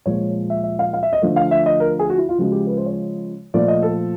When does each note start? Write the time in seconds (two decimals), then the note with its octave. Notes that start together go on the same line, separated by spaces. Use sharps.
0.06 A#2 F3 G#3 C#5
0.50 E5
0.64 E5
0.79 F5
0.93 F5
1.03 E5
1.13 D#5
1.22 D3 F3 A3
1.36 F5
1.51 E5
1.66 D#5
1.80 A#4
1.99 G#4
2.10 F#4
2.18 E4
2.29 F4
2.38 C#3 F3 G#3 F#4
2.52 G4
2.67 B4
2.77 C5
2.86 C#5
3.54 A#2 F3 A3 D5
3.68 D#5
3.82 A4